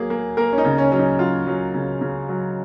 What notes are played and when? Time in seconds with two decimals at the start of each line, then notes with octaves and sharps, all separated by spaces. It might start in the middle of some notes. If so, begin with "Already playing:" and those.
Already playing: F#3 A#3 G#4
0.10 A#3
0.37 A#3 A#4
0.52 C#4
0.58 D#4
0.65 C#3
0.78 C#4
0.92 F#3 C#4
0.99 D#4
1.19 F#3 F4
1.47 F#3
1.74 C#3
2.01 C#3
2.29 F#3